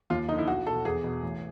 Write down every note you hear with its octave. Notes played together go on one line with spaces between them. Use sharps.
D#2 F4
D3 F3 D#4
E4
B1 F#4
B2 A4
E2 G#4
B2
A1